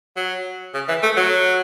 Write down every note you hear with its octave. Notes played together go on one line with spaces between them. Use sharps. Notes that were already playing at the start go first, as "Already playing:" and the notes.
F#3
C#3
E3
A3
F#3